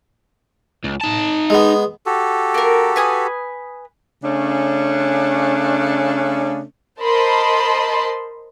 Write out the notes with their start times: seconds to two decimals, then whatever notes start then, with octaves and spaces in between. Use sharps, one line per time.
0.84 C#2
1.01 D#4 A5
1.50 G#3 B3
2.06 F#4 G4 A4
2.54 A#3 A#4
2.96 B4 G#5 D#6
4.23 C#3 A3 C#4 D4
6.99 A#4 C5 D#5 A5 B5 C6